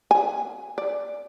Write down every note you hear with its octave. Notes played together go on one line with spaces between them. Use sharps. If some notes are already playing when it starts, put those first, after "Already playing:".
G#5
D5